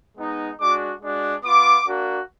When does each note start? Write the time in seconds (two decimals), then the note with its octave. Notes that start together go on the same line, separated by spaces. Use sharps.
0.17 G#3 B3 D#4
0.59 G#3 D4 F#4 D6
1.01 G#3 D4 F#4
1.44 B3 F4 D6
1.87 A#3 D4 F#4